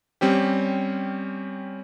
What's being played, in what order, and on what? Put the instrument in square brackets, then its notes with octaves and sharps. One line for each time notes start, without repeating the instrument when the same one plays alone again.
[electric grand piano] G3 C4 C#4 G4